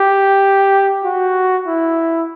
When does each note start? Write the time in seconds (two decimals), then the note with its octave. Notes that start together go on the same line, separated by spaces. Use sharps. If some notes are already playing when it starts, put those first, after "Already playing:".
Already playing: G4
1.04 F#4
1.66 E4